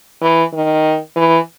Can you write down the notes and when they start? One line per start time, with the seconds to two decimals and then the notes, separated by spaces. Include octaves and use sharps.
0.22 E3
0.53 D#3
1.16 E3